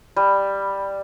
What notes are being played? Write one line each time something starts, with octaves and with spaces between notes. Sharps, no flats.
G3